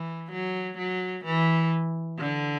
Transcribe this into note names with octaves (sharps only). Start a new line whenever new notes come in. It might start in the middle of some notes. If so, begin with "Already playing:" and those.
Already playing: E3
F#3
F#3
E3
D3